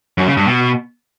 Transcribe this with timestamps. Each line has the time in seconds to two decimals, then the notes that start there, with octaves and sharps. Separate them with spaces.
0.18 F#2
0.27 C#3
0.37 G2
0.47 B2